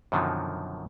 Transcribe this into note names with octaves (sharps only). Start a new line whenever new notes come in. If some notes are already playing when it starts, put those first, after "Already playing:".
F#2 B2 D3 D#3 F3 F#3